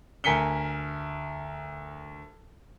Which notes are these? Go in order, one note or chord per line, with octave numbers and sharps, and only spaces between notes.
D2 A#4 G#5 B6 C#7 G7